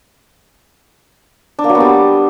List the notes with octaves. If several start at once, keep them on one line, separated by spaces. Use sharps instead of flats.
D4
A#3
F#3
B3
G3